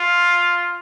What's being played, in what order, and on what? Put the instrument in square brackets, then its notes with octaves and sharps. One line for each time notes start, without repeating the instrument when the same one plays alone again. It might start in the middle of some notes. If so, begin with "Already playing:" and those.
Already playing: [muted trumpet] F4